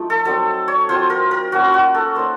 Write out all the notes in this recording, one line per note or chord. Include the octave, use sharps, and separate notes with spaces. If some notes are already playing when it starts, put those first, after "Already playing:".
Already playing: F3 A3 D#4
A4
F#3 C4 D#4 A4
C#5
F#3 C4 F4 C5
A#4
A#4
A#3 C#4 F4 F#4
F#4
A4
A#3 D#4 C5